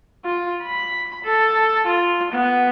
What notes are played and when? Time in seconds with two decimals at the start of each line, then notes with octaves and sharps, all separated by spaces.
0.25 F4
0.63 B5
1.24 A4
1.87 F4
2.32 B3